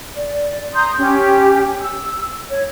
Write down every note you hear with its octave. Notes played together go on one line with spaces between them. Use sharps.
D5
A#5 C6 D#6 G6
C#4 G4
E6
C#5